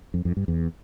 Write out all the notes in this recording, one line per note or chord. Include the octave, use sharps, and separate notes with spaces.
F2
F2
G2
E2